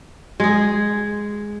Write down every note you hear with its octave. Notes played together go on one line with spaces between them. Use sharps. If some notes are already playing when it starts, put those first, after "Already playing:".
G#3 G#4